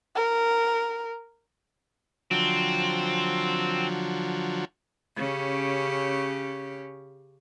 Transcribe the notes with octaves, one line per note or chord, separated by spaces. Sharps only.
A#4
D3 F3 F#3 C4
C#3 C#4 G4